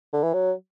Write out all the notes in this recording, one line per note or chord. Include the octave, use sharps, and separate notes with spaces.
D3
E3
F#3